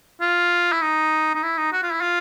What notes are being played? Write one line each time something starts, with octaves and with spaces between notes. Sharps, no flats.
F4
E4
D#4
D#4
E4
D#4
F#4
F4
E4
F4